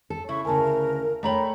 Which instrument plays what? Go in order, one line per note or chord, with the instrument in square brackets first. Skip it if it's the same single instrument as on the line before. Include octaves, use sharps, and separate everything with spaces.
[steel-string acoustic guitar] A4
[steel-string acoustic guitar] C#3 [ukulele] E4 E5 [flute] C#6
[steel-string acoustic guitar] D2 C#3 [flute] A#4 [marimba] G#5 A5
[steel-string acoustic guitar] A3 C#5 G5 [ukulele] D4 A#5 B5